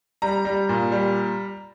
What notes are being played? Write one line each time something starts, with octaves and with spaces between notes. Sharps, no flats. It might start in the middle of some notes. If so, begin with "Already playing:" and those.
G3 A#5
G3
A#2
G3